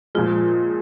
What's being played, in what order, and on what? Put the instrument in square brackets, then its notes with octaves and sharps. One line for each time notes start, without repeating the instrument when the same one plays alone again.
[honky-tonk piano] A#2 F3 G#3 [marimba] F4